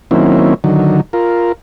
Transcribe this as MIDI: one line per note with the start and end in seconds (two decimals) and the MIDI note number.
0.11 0.54 51
0.11 0.54 54
0.11 0.54 58
0.11 0.54 60
0.11 0.54 61
0.11 0.54 64
0.64 1.01 50
0.64 1.01 51
0.64 1.01 54
1.13 1.52 65
1.13 1.52 70